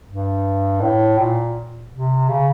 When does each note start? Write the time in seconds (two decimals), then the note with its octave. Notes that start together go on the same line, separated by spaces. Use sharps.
0.08 G2
0.81 A2
1.19 A#2
1.92 C3
2.29 C#3